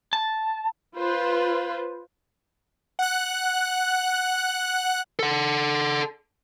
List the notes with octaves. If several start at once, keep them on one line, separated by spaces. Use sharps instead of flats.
A5
F4 B4 C5
F#5 F#6
A4 F#5